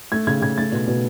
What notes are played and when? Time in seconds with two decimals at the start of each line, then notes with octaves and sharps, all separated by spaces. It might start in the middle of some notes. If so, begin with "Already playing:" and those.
0.12 A3 G#6
0.27 C#3 G#6
0.42 C#3 G#6
0.58 A3 A6
0.72 B2
0.87 B2